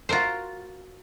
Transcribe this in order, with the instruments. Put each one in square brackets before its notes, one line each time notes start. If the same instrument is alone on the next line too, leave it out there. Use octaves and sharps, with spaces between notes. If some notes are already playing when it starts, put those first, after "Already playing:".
[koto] F4 F#4 A#4 C5